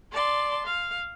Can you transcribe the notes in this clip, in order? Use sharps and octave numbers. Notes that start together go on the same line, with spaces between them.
D5 A5 C6
F5